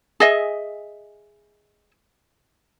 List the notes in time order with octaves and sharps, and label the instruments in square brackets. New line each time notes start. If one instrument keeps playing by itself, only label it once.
[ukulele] G#4 D#5 E5